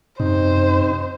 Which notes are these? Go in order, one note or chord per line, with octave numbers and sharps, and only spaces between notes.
F#2 C3 D#4 C5